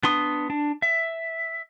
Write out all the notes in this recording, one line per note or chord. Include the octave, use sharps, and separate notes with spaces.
B3 D4 C6 D#6
D4
E5